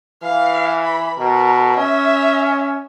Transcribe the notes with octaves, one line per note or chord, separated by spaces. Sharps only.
E3 F5
B5
B2 A#4
C#4 E5